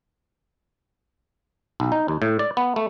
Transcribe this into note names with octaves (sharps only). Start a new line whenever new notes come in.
B1
D#4
D#2
A2
D5
B3
A3